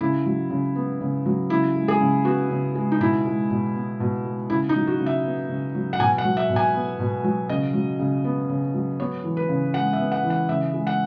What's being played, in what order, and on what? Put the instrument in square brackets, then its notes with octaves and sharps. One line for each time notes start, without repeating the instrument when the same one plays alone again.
[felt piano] C#3 E4
F#3
C#3
B3
C#3
F#3
C#3 E4
G#3
G#4
C#3
B3 F#4
C#3
G#3
D#4
B2 E4
G#3
B2
B3
B2
G#3
C#3 E4
D#4
F#3
F#4
C#3
E5
B3
C#3
F#3
F#5
B2 G#5
F#5
F#3
E5
B2
G#5
B3
B2
F#3
C#3 D#5
F#3
C#3
B3
C#3
F#3
B3 C#5
E3
B4
C#3
G#3 F#5
E5
B3
F#5
E3
F#5
C#3 E5
G#3
F#5